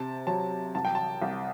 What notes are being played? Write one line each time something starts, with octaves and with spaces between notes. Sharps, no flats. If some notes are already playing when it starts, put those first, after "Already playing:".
Already playing: C3 A5
F#3 A5
C2 A5
G5
A5
C2